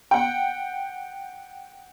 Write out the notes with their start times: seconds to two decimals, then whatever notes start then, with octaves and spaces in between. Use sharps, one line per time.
0.11 F#5 G5